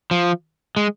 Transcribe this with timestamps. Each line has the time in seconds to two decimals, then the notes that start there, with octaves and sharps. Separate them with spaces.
0.11 F3
0.77 G#3